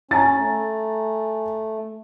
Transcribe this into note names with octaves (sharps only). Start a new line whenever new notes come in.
C#4 G#5 A#5 A6
A3